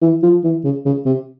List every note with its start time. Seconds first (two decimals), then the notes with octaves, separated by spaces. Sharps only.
0.01 E3
0.22 F3
0.43 E3
0.64 C#3
0.85 C#3
1.06 C3